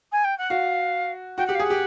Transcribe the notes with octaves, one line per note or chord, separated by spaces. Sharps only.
G#5
G5
F#5
F#4 F5
F#4 G5
G4 F#5
F5
G#4
F#5
G4